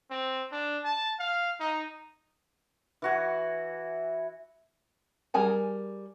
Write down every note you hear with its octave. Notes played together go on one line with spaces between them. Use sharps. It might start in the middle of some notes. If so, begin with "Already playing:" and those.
C4
D4
A5
F5
D#4
E3 F#4 G#5
G3 G#4 A#4 G#5 A5